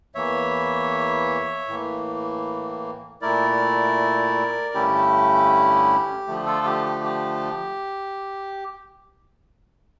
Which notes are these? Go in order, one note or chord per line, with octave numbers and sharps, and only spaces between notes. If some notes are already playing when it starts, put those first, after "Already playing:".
E2 E3 A#3 C#5 E5
A2 E3 A#3
A#2 A3 E4 A#4 D5
G2 D3 A3 C#4 E4 G4
D3 F3 A3
F4 A4
G4
G4
G4